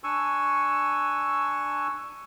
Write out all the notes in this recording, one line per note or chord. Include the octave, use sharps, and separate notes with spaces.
D4 G#5 C#6 E6